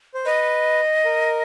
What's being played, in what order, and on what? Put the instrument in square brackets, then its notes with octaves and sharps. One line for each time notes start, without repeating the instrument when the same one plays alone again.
[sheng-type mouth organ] C5
[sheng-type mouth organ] B4 [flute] D#5
[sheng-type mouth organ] A#4